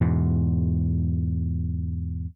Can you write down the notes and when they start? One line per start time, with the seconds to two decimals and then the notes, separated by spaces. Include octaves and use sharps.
0.01 E2 G#2 B2